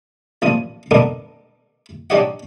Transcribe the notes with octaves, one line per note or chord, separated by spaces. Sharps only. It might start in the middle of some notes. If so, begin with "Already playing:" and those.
A1 A#2 F3 D#6
B3 D4 D#4 A4 A#4
D4 D#4 G4 C#5 D#5 F#5